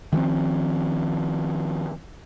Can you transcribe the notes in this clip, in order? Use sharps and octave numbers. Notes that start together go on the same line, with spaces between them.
D#3 F3 A3 C4